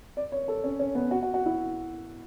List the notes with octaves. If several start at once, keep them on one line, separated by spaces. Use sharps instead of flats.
D5
C#5
A4
C#4
C#4
B3
F#4
F#4
F#4
E4